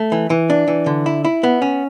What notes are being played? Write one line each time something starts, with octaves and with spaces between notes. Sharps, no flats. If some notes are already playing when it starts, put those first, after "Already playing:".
Already playing: A3
E3
E3
D4
E3
D3
E4
E4
B3
C#4